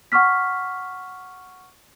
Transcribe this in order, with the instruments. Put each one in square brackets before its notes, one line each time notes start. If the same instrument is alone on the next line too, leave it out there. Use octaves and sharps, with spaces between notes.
[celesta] F#5 C#6 D6 F6 B6